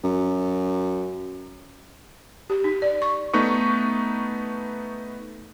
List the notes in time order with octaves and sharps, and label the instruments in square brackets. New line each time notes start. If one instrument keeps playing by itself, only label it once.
[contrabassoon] F#2
[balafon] G4
D#4
D5
C#6
[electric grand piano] A3 B3 D#4 B4 C#6